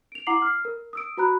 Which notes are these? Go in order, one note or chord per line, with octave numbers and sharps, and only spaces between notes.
D7 F7
E4 F#5 A#5 D6 C7 F#7
F6 C7
A#4
D#6 E6 D7
F#4 B4 A#5 B5 F#6